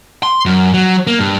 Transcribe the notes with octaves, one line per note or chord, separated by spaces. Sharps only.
C6
F#2
F#3
A#3
G2